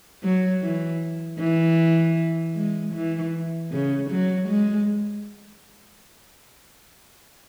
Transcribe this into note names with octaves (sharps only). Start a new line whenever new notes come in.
F#3
E3
E3
G#3
E3
C#3
F#3
G#3